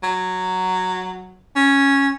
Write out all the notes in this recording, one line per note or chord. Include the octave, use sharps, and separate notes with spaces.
F#3
C#4